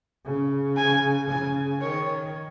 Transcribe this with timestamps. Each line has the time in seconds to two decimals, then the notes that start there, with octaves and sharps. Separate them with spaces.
0.25 C#3
0.77 G#5
1.29 C#3 G#5
1.81 D#3 C#5